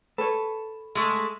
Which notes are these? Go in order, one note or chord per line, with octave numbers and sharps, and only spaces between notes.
A4 B4 C#5
G#3 A3